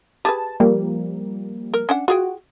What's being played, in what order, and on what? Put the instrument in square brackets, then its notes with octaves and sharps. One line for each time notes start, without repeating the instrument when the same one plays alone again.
[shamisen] G4 G#4 B4 [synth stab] A5
[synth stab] F3 G3 A#3
[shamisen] A#4
C#4 D4 F#5
[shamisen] F4 G#4 G5 [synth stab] F#4